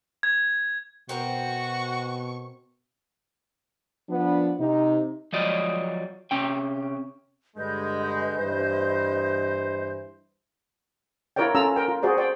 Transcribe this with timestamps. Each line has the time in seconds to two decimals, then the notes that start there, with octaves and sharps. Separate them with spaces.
0.23 G#6
1.09 B2 C4 F#4 A#4 C5 C#6
4.09 F3 B3 D4
4.59 C3 D#4
5.33 F3 F#3 D5 D#5
6.31 C3 C#4 G5
7.57 G2 D3 G#3 B4 D#5 G6
8.39 G2 E3 C5
11.36 E4 F4 A#4 C#5 D5 G5
11.55 C#4 F4 A4 A#5 E6
11.76 A#4 G5
11.88 F4
12.03 F#4 G#4 C5 D5
12.17 C5 D5 G5